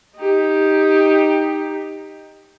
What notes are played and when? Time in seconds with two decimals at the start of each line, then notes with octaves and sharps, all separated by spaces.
0.17 D#4 G4